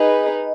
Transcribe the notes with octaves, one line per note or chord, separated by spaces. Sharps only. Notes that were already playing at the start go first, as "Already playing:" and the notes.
Already playing: D#4 G#4 B4 D#5